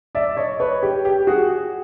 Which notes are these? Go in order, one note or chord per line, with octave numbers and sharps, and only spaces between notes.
D5 E5
C#5 D#5
B4 C#5
G4
G4
F#4 G#4